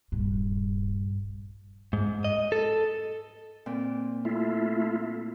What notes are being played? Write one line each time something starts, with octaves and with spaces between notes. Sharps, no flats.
D#1 A#1 G2
G#2
D#5
A4
A#2 C4
A3 E4 F4